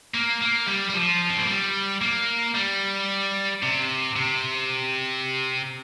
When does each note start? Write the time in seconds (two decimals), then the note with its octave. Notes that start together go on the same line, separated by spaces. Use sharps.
0.14 A#3
0.41 A#3
0.67 G3
0.89 G3
0.94 F3
1.30 C4
1.39 A#3
1.48 G3
2.02 A#3
2.55 G3
3.63 C3
4.16 C3